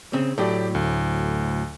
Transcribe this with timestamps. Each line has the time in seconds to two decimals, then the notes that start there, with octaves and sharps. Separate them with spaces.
0.13 C#3 C4
0.38 A2 F#3 A3 G4 D5
0.75 D2